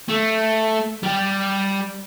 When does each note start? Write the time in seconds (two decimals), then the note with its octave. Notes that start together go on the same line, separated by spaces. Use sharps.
0.09 A3
1.03 G3 G4